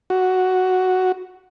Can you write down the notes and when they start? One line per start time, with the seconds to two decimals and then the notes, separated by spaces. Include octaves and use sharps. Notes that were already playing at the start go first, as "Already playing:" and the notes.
0.10 F#4